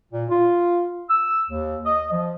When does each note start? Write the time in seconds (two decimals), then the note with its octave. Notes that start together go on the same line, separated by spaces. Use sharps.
0.12 A#2
0.30 F4
1.09 E6
1.50 D#2
1.86 D#5
2.12 F3